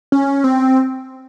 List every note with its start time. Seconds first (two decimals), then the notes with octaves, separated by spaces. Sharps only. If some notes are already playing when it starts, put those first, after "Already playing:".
0.12 C#4
0.44 C4